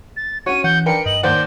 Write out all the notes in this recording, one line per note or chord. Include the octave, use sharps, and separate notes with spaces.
A6
C#4 F#4 C#5 D#7
E3 F#5 G6
D4 A#4 B4 G5 C#7
G2 D#5 F#7
D#2 C5 D5 F#5 G6